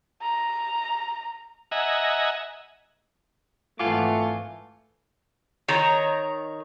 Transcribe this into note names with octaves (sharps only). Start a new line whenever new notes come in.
A#5
D#5 E5 F#5 G#5 A#5
G#1 E3 A3 F4 F#5 G#5 D6
D#3 C#5 A#5